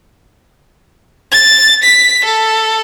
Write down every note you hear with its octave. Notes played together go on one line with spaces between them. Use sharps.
A6
B6
A4